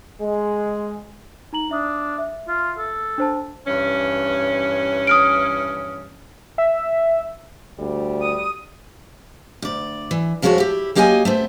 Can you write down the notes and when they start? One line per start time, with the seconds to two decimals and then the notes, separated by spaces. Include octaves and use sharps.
0.21 G#3
1.53 D#4 A#5 F#7
1.71 D4 E5 D#6
2.18 E5
2.48 F4
2.78 A4
3.18 D4 C5 A5
3.66 G2 E3 C#4
5.07 D#6 F6 D7
6.58 E5
7.79 D2 G3
8.22 D#6
9.62 D2 D5
10.11 E3
10.42 F2 F3 G#3 F#4 C#5 A5
10.58 E4 G4
10.95 F#3 A#3 G4 D#5 G5 G#5
11.25 A3 B3 C4